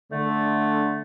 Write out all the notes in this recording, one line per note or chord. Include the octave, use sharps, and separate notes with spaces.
D3 A3